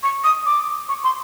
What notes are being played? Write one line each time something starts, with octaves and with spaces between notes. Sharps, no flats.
C#6
D#6
D6
C#6
C6